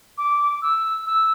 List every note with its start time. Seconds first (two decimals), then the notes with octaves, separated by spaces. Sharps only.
0.18 D6
0.62 E6
1.06 E6